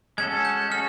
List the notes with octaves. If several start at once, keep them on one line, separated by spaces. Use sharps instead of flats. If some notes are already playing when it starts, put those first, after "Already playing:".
G#3 C#4 F#4 A4 G#6
G6
G#3 C#4 F#4 A4 F6